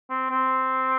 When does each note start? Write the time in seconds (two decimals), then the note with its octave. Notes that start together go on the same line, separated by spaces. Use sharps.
0.10 C4
0.31 C4